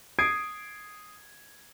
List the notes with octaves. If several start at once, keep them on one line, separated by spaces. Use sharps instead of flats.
D#6 G#6 C7 D7